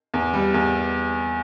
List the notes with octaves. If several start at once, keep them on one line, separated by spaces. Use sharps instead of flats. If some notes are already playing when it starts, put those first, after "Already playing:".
E2
G3
E2